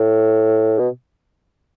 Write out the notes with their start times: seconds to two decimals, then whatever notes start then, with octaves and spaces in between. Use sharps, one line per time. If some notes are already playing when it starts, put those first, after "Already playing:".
Already playing: A2
0.79 B2